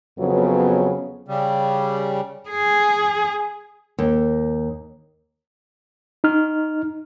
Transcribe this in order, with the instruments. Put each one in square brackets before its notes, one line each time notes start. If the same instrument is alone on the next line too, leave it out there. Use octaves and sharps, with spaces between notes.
[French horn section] F2 C#3 F#3 B3
[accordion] C#3 G3
[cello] G#4
[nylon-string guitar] D#2
[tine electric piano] D#4 F6